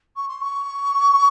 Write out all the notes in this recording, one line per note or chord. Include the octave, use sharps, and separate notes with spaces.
C#6
C6
C#6